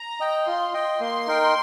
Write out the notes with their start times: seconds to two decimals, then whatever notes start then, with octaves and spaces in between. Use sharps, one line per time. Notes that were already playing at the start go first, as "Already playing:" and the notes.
Already playing: A#5
0.20 D#5 G5
0.46 F4 C6
0.74 D#5 G5
1.00 A#3 C6
1.27 D#4 A#4 G5